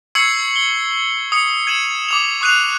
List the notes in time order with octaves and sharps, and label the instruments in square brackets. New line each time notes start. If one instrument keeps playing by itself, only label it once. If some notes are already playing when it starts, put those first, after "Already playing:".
[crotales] C#6 E6 G#6 C7 C#7 F#7
G7
D#6 C#7
G#6 D#7 E7 F#7
D6 D#6 F7
C#6 D#6 F#6 C7 D#7 F7